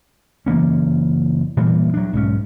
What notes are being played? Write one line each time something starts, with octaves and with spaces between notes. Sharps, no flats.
F#1 E3 A#3 C#4
A#2 E3 G3 A#3
F#3 D4
B1 G#2 C#4